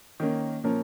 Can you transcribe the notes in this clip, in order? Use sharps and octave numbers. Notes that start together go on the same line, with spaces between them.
D#3 A#3 C#4
A#2 F3 C#4 A#4